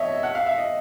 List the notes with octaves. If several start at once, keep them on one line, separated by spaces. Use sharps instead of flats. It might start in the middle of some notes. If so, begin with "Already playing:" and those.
Already playing: C#5 D#5 E5
F#5
F5
E5
D#5